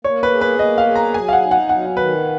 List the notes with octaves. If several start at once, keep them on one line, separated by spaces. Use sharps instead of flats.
A#3 C#5
B4
G#4
B4
A#3 D#5
F5
G#4
A#5
F#3 G#5
F5
F#5
D#4
F#5
F#3 F#5
D#3 B4